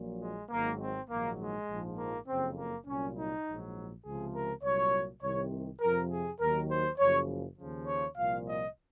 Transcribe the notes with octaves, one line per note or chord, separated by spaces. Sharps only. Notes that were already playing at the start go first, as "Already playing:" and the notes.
Already playing: A#1 A#2 F#3
G#3
G#1 G#2 D#3 F#3 A#3
C4
A#1 G#2 D#3 F#3 A#3
G#3
A#1 G#2 F3
A#3
F#1 F2 C#3 C4
A#3
C2 A#2 F#3 C#4
D#4
A#1 G#2 F#3
C#2 C3 F3 G#4
A#4
C2 A#2 F#3 C#5
C2 C3 D#3 C#5
F2 C3 F3 A#4
G#4
D#2 D#3 F#3 A#4
C5
F#1 F#2 C#3 F3 C#5
D#2 C#3 F3
C#5
C2 A#2 F3 F5
D#5